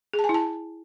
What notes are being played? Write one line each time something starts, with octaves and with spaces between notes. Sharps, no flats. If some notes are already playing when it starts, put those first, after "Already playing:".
G#4
A5
G#5
E4
A5